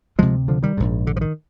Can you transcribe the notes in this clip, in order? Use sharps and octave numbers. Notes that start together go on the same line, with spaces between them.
D2 C3 F3 G#3
D3 F3
D#3 G3
A#1 G#2
D3
F3
D#3